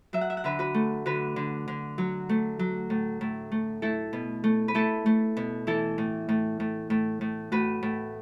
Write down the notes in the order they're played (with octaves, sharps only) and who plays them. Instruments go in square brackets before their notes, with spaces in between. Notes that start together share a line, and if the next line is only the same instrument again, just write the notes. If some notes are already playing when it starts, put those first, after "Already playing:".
[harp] F#3 E5
F#5
E5
F#5
D3 B4 E5
F#4 B4
A3
D3 F#4 B4
D3
D3
F#3
A3
F#3
A2
A2
A3
A3 E4 A4
B2
A3
B4
A3 E4 A4
A3
B2
E3 E4 A4
A2
A2
A2
A2
A2
A2 F#4 B4
A2